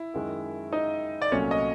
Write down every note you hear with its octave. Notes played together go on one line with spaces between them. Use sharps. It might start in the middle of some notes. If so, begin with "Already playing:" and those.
Already playing: E4
F#2 D#3 G#3
D#4 D#5
D5
C2 A#2 F#3 A3 C#4 C#5
D#5